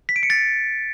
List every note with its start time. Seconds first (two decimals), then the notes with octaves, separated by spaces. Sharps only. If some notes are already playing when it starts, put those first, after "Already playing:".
0.09 B6
0.16 D7
0.23 C#7
0.30 A6